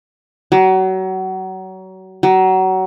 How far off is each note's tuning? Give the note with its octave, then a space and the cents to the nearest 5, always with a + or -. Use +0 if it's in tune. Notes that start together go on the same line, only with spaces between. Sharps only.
F#3 +30
F#3 +25